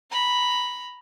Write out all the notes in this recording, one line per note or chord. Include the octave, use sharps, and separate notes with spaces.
A#5 B5